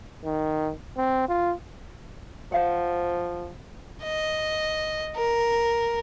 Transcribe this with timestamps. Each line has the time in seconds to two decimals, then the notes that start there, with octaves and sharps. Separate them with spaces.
0.25 D#3
0.97 C4
1.29 F4
2.52 F3 C5 F5 F#5
4.03 D#5
5.16 A#4